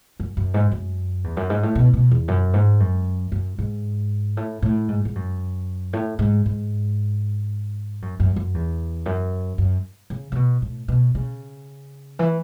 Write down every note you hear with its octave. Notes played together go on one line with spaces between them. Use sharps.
F#2
F#2
G#2
F#2
E2
F#2
G#2
A2
B2
B2
E2
F#2
G#2
F#2
F#2
G#2
A2
A2
G#2
G#2
F#2
A2
G#2
G#2
F#2
F#2
F#2
E2
F#2
F#2
C#3
C#3
B2
A2
B2
C#3
E3